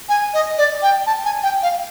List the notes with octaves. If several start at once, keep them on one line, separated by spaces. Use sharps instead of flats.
G#5
D#5
D5
G5
A5
G#5
G5
F5